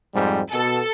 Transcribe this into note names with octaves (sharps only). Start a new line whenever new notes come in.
F2 G#2 G3
B2 A4